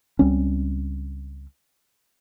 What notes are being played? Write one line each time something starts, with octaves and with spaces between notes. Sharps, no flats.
C#2 G3 C4 C#4